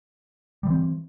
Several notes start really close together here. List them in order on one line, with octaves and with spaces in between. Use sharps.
G3 E3 C4